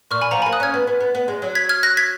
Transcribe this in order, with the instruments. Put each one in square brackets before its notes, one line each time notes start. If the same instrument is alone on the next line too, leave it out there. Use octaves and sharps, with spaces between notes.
[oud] A#2 [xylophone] C#6 F6
[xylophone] G#5 B5
[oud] F3 [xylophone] F#5 A#5
[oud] A#3 [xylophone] G#5 B5
[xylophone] D#6 F#6
[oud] C#4 [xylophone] F6 G#6
[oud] B3
B3
B3
B3
G#3
F#3
[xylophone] G#6 B6
F6 G#6
F#6 A#6
G#6 B6